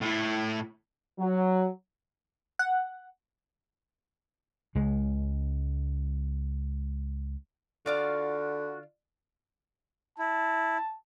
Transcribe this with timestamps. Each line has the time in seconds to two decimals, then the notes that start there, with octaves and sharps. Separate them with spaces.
0.01 A2 E4
1.19 F#3
2.59 F#5
4.75 C#2 C#3 G#3
7.86 D3 F4 F#4 D5 F5
10.19 E4 A5